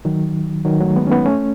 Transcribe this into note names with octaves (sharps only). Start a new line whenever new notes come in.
D#3 F#3
D#3 F#3
F#3 A3
G#3 B3
C#4
B3 D#4
A3 C#4